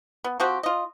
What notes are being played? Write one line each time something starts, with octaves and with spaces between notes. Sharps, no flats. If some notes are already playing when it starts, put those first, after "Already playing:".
B3
F3 C4 F#4 G4
F4 D#5